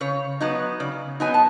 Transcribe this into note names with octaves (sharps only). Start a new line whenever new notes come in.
C#3 C#5
F#3 B3 D#4
C#3 D5
F#3 B3 D#4 G#5
A5